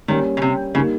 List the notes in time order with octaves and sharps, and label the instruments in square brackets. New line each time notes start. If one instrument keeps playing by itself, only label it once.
[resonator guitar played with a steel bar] D#3 [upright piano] G3 A#3 C#4
[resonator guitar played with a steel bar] C#3
C3
[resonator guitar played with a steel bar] C#3 [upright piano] G3 A#3 D#4